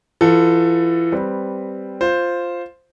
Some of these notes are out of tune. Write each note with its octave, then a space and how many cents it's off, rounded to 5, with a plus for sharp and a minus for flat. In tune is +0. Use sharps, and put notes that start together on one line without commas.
E3 +30 F4 +30 A4 +10
G3 +0 C4 +0 B4 +0
F4 +0 C5 +0